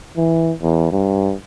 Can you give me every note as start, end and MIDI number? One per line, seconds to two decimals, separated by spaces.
0.17 0.52 52
0.62 0.90 40
0.91 1.34 43